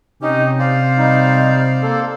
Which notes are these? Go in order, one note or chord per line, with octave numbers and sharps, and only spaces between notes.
C3 C#4 D#4 G4
C5 D5 F5
G3 D#4
A#3 A4